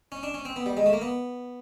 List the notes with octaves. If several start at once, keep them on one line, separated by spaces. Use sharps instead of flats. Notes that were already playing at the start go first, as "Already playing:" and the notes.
C#4
D4
C#4
C4
B3
G3
G#3
A3
A#3
B3